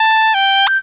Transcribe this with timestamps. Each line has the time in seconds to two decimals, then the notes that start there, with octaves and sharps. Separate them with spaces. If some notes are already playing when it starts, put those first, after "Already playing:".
Already playing: A5
0.34 G5
0.67 G6